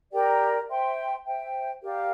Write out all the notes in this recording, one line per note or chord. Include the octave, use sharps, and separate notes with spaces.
G4 A#4 D5 G5
C5 E5 G5 C6
C5 E5 G5
G4 A#4 D5 F5